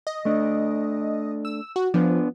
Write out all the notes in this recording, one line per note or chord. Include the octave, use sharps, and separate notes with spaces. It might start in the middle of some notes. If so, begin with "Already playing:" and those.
D#5
A3 D4
E6
F#4
F3 B3 D4